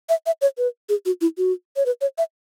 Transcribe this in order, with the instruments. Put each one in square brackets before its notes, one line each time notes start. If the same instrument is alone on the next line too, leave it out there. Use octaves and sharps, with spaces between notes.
[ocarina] E5
E5
C#5
B4
G#4
F#4
E4
F#4
C#5
B4
C#5
E5